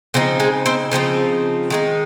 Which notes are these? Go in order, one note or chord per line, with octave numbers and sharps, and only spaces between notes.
C#3 F3 C4 D#4
G#3 G#4
C4 C5
C#3 F3 C4 D#4
D#3 G#3 D#4